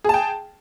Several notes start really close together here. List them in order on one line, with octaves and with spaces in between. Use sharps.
G#4 A5 G5